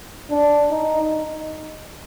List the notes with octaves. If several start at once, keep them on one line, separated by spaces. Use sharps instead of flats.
D4
D#4